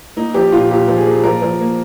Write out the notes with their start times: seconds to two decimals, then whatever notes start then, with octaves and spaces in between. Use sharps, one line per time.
0.16 A#3 D#4
0.34 F3 G4
0.52 A#2 F4
0.71 A#2 G4
0.88 F3
0.97 G#4
1.06 A#3
1.24 F3 A#4
1.42 F3
1.60 A#3